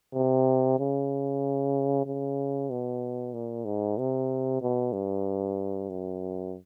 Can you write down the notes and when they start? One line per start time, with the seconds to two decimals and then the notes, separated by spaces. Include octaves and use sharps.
0.14 C3
0.79 C#3
2.06 C#3
2.70 B2
3.33 A#2
3.65 G#2
3.98 C3
4.62 B2
4.93 G2
5.89 F#2